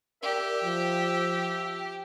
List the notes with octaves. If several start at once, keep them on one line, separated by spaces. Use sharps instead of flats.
G4 A#4 D5 E5
F3